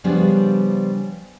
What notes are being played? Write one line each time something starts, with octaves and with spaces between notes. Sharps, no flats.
C#3 F3 G3 B3 D4